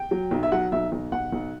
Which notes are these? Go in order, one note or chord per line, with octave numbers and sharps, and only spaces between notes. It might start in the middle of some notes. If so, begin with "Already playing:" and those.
Already playing: G5
F#3
B1
E5
F#3 F#5
B1 E5
B1
B1 F#5
B1